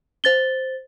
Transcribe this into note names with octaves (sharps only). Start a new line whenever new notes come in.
C5 A6 G7